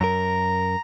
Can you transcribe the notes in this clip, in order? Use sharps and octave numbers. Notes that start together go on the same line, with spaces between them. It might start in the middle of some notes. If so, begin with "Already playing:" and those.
F#2 A#4 A#5